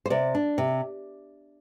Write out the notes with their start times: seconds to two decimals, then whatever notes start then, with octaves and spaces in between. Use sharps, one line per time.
0.06 C5
0.10 C3 D5
0.35 D4
0.58 C3